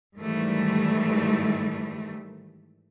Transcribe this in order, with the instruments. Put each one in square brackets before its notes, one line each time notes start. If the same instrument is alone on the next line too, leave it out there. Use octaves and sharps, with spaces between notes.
[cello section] G#2 D#3 E3 G3 A3